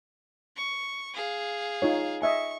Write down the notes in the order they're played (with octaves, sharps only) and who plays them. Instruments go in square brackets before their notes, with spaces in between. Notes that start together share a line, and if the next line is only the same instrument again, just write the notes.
[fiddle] C#6
G#4 F5
[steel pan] D#4 F4 C#5
[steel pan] D#5 E5 G#5 [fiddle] C#6